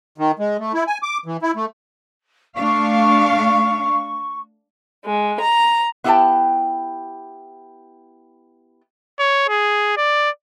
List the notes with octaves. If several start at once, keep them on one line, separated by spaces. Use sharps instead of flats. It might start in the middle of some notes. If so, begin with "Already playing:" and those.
D#3
G#3
A3
E4
G#5
D6
E3
E4
A3
A3 D4 F5 C#6
G#3
A#5
B3 E4 G4 F5 G5 A5
C#5
G#4
D5